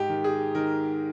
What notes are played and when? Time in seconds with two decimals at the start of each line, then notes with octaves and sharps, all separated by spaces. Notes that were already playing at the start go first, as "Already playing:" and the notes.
Already playing: G#2 G4
0.09 D#3
0.24 G#4
0.55 D#3 A#4